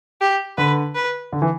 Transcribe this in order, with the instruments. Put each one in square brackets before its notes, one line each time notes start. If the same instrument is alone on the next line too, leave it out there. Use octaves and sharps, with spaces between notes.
[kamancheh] G4
[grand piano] D3 [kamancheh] B4
[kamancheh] B4
[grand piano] D3
E3